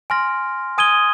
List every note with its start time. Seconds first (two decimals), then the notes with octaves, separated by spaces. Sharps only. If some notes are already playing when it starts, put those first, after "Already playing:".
0.10 G#5 C6 F6 A#6
0.78 G#5 D#6 G#6 D#7 G7